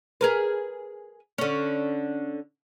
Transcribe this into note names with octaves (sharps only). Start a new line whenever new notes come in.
G#4 A#4 B4
D3 C#4